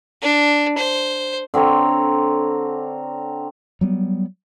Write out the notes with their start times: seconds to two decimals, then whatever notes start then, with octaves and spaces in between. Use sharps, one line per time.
0.22 D4
0.77 C5
1.54 D3 C4 A#4 C#5
3.81 F#3 G3 B3